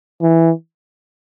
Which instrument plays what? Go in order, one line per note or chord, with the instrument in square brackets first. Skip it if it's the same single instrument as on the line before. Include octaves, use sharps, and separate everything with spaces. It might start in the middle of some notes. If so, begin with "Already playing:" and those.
[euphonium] E3